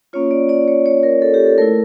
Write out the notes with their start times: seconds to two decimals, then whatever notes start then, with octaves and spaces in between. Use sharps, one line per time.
0.13 A#3 C#4 F4 C#5
0.31 D5
0.49 D5
0.68 C#5
0.86 C#5
1.03 A#4
1.22 A4
1.34 G4
1.46 A4
1.58 A3 E4 A#4